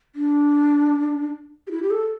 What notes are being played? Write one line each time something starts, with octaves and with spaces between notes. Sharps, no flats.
D4
G4
E4
G4
A4